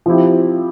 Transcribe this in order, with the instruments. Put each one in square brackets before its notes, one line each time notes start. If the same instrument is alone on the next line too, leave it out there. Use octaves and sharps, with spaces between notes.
[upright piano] F3 C4 E4 G4